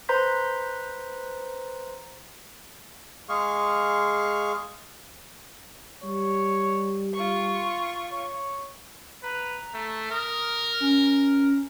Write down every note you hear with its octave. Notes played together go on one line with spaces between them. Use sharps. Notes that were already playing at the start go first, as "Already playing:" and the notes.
B4 C5 A#5 C6 G6 B6
G#3 G#4 F5 C#6
G3 C#5
F4 C#6
C6
C#5
B4 A#5
A3
A#4 D#6
C#4